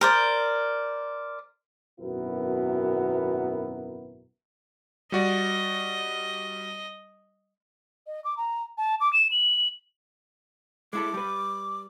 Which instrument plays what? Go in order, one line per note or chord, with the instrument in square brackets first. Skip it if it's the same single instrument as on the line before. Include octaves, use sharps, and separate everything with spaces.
[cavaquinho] A#4 C5 D5
[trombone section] G#1 F#2 B2 B3 E4 A#4
[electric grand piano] G3 F#4 D5 [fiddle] D#5
[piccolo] D#5
D6
A#5
A5
D6
E7
F#7
[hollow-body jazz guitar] G#3 E4 A4 [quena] D6
[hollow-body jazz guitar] G3 B4